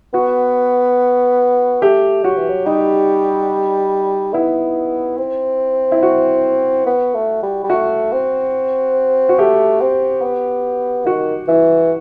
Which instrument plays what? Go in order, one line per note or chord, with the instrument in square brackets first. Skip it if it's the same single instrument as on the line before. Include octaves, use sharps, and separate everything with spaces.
[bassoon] B3 [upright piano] F#4
[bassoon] A3 [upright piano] G4
[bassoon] F#3 [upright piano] F#4
[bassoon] E3
F#3
[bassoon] G3 [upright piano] D#4
[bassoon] B3 [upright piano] E4
[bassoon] C4
[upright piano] E4
F#4
[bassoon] B3
A3
G3
G3
[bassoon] A3 [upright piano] F#4
[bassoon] C4
[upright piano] F#4
[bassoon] A3 [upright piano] G4
[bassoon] C4
B3
[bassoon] D#3 [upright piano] F#4
[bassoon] E3 [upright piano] E4